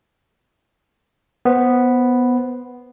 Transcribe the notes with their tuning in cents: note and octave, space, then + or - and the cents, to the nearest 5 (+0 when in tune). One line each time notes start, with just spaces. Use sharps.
B3 +0 C5 +0